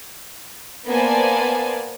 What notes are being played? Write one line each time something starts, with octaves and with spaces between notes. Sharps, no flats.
A#3 B3 C5 D5 G#5 A5